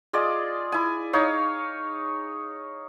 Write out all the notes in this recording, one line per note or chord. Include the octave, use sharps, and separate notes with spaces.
F4 G#4 D5 D#5
E4 G#5
D#4 C#5 F5